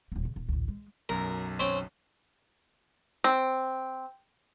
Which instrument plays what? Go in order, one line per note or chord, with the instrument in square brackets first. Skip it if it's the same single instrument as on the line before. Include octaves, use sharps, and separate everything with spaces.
[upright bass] D#1 A#3
C#3
D#1
A1 D2
G#3
[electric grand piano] B1 F#2 [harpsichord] A#4
[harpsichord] C4 C#4 G5
[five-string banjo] C4